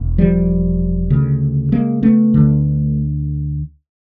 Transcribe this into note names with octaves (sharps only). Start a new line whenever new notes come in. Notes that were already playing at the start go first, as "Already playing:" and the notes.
Already playing: E1
F3 G3
D2 C#3
G#3 A#3
A3 B3
D2 D3